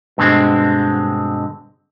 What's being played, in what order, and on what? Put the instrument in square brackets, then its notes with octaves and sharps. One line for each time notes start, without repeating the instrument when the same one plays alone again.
[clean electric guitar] G2 B2 D3 G3 G#3 C4